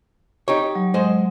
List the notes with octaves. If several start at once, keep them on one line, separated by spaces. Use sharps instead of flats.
D#4 G4 C#5
F#3
G#3 C5 D#5